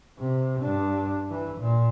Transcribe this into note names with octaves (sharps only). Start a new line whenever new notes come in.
C3
G2 D4
E3
A#2